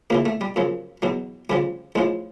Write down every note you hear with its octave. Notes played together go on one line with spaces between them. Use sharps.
C#2 C#3 E3 A#3
A3
G3
F#2 C#3 F3
E2 B2 F#3
D2 C#3 F3 G3
A1 A2 F3 G#3